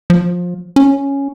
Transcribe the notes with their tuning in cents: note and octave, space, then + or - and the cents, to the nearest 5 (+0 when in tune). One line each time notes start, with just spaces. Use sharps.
F3 +20
C#4 +0